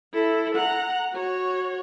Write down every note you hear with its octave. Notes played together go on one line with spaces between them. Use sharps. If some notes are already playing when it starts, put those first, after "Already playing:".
E4 A4
F#5 A#5
F#4 C#5